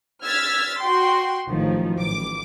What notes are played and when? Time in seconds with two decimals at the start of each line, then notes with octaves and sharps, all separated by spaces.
0.24 E6 F6 G#6 A6 B6
0.81 F#4 G5 C6
1.49 A1 D#3 F3 F#3
1.99 A1 D6